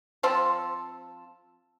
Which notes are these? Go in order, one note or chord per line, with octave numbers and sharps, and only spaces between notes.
F3 C4 F4 A4